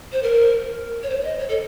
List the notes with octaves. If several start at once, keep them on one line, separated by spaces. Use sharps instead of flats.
C5
A#4
C#5
C5
C#5
D#5
C#5
A4